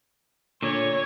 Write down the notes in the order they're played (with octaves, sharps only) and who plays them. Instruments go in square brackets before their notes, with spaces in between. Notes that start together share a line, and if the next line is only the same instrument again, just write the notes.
[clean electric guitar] A#2 D3 [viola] C#5